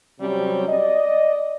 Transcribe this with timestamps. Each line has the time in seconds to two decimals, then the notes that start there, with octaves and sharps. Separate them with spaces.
0.20 C3 F#3 G3 C4 C#4
0.68 D5 D#5